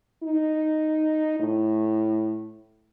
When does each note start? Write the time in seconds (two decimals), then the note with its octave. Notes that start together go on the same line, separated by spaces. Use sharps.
0.23 D#4
1.40 A2